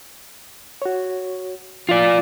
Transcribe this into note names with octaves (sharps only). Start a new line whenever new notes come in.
F#4 C#5
F3 F4 D5 F5 A6